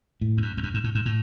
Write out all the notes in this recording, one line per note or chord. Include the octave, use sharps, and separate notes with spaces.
A2
E2
F#2
E2
F#2
G#2
A2
G#2
A2